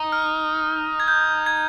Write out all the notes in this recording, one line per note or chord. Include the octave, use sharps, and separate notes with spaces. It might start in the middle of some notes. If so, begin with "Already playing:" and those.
Already playing: D#4
F6
G#6
G6
G#6